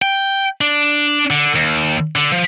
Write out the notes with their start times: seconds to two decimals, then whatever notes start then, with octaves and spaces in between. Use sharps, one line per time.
0.02 G5
0.61 D4
1.30 D3
1.55 D#2
2.16 D3
2.32 F3